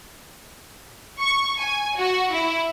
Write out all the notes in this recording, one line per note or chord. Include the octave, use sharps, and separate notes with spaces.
C#6
G#5
F#4
E4